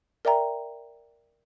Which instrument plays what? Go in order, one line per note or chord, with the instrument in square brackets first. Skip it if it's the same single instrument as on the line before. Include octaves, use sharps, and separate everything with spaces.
[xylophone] A#4 D5 E5 G5 A#5